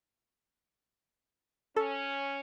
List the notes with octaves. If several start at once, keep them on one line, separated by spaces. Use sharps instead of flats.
C#4 A4